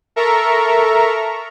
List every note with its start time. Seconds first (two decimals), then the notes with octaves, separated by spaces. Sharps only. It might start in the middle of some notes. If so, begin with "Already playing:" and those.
0.16 A4 A#4 E5 A#5 C#6